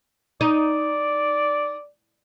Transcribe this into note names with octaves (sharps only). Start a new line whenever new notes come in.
D#4 D5